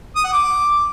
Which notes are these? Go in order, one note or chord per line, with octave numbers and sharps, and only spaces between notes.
D#6
F#5
D6